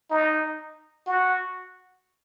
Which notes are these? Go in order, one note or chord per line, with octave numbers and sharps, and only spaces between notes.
D#4
F#4